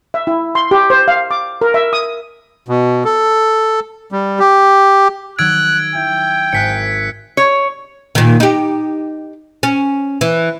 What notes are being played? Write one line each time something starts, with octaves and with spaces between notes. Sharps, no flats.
E5
E4
C6
G4
C5
F5
D6
A#4
E5
D#6
B2
A4
G3
G4
D#3 F#3 D#4 E6 F#6 G#6 D7
E4 G5
G#1 G#5 F#6 B6 C#7
C#5
A#2 D#3
D#4 G4
C#4
E3